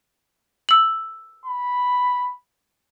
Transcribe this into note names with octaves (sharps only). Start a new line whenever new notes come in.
E6 F#7
B5